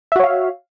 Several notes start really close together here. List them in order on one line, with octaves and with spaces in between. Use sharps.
E5 F#4 C#5 F5